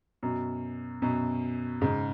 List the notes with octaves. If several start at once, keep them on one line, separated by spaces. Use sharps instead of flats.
F#2 B2
F#2 B2
G#2 C#3